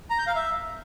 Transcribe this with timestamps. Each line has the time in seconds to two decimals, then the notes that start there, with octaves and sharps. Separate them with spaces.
0.10 A#5
0.19 G6
0.27 F5
0.35 E5